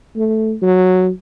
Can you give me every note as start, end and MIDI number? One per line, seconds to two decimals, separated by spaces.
0.17 0.54 57
0.62 1.10 54